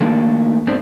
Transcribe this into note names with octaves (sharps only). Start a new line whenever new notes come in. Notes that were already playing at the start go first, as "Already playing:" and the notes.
D#3 A3 A#3 D4
G#2 B3 C4 D4